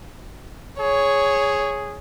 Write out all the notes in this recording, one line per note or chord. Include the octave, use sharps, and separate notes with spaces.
G#4 C#5